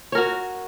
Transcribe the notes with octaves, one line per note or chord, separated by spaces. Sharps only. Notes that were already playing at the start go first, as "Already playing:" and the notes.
F#4 A#4 C#5